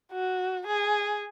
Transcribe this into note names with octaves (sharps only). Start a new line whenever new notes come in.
F#4
G#4